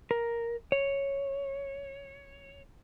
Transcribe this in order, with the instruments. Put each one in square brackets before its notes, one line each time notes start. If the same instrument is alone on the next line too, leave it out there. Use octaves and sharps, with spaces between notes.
[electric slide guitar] A#4
C#5